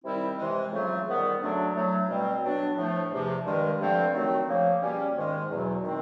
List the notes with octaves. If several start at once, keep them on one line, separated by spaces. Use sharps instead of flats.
C3 D#3 G3 C4 E4
C3 E3 G#3
F2 C#3 F#3 A3
G#2 D#3 G3 B3
F#2 D3 F#3 A3 D4
A2 F#3 A3
B2 G3 C4
B2 F#3 B3 D4
A2 F3 A3
E2 C3 F3
G2 D#3 G#3
G2 D3 F3 A3 C4
D#3 F#3 A3 C4
C#3 F3 A#3
B2 G3 A#3 C#4
G#2 D#3 G#3
E2 B2 F#3
D#3 G#3 C4